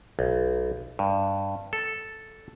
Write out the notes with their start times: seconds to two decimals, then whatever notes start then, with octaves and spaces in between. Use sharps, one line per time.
0.19 B1
0.99 G2
1.73 A4